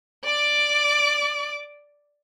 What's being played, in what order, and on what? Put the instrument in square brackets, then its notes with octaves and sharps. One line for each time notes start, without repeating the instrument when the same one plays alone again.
[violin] D5 D6